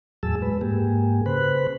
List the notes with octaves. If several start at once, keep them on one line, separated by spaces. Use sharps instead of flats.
E2 A2 F#3 G#4 A5 E6
G#3 B4
G#2 A#3 G4 G#4
C#3 B4 C5 B5 F#6